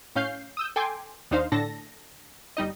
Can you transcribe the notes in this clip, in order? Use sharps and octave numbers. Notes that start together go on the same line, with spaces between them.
A2 C#4 F5 G6 C7
D#6 E6 G6
A4 G5 G#5 C6 D6
D#2 D4 D#4 C5 F5
A2 D3 D4 A4 A5 A#6
G1 G3 D#4 D#5